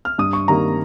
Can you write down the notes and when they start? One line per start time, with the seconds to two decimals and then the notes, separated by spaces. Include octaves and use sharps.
0.05 F6
0.18 G2 D#6
0.33 C#6
0.48 D#3 G3 A#3 A#5